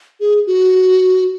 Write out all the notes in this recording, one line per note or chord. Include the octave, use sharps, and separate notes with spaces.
G#4
F#4